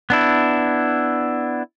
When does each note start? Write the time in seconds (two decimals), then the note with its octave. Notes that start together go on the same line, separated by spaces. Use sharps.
0.10 B3 D4 E4